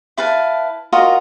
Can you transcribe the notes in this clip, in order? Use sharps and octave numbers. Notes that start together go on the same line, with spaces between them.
E4 B4 F5 A5
F4 F#4 A#4 D#5